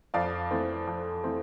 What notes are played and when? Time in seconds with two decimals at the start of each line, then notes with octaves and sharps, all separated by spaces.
0.14 F2 D5 F5
0.51 E3 A3 C4
0.87 F2
1.23 E3 A3 C4